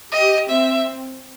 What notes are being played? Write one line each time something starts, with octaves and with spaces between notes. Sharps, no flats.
G4 D#5
C4 E5